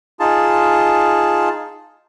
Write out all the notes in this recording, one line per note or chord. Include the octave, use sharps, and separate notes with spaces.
D#4 F4 G#4 A5